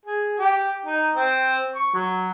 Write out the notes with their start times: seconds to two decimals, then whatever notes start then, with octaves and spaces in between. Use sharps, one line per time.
0.05 G#4
0.39 G4
0.86 D#4
1.14 C4
1.75 C#6
1.95 F#3